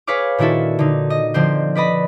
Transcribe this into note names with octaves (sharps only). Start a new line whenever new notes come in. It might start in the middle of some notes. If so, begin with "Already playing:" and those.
G#4 B4 C#5 F5 D6
A#2 D#3 D4 E4 F#4 A4
D3 D#4
D#5
D3 F3 C4 C5
B4 D5 D#5 B5